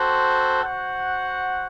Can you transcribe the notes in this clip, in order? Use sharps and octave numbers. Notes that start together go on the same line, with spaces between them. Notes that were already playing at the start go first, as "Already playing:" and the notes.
Already playing: C4 F#4 A4 C5
F#4 C5 F#5